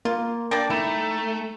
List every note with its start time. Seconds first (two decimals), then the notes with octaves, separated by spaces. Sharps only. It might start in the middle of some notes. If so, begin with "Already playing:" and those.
0.05 A#3 F4
0.51 A#3 D4 D5 G5
0.70 A3 D#4 E4